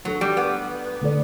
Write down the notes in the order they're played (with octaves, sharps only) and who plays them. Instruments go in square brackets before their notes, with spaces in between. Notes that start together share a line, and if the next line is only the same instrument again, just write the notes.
[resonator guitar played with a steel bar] F#3 [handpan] A3 D4 A4
[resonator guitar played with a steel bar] G3
B3
[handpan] D3 A3 D4 A4 D5